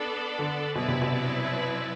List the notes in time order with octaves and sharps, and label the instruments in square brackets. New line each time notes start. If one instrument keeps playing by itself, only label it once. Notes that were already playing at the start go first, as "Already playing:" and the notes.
Already playing: [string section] B3 D4 A4 D5
[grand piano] D3
[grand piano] B2 [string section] F#3 C4 E4 B4 D5
[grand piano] C3
B2